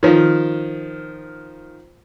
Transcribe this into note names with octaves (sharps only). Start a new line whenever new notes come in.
D#3 F3